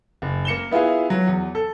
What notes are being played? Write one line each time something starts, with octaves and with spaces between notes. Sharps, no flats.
F#1
A#3 C#7 E7 G7
B3 E4 F4 G#4 F5
F#3
E2
A4